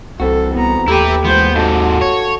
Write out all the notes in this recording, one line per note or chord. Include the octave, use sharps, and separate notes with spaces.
C2 E3 C4 F#4 A4
B3 A#5
D#2 A3 E4 G4 B4 G5 A#5
E3 G#3 B3 F4 C5 G5
G#2 C3 F#4 A4 F5 A5
C#5